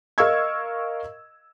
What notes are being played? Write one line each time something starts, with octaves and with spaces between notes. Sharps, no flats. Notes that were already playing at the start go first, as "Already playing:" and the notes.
A#4 D#5 F5 C#6 E6 G#6